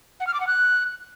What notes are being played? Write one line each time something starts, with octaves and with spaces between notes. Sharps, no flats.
F#5
F6
D6
F#5
F#6